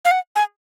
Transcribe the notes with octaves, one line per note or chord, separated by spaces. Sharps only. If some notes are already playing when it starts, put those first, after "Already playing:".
F5
F#5
G#5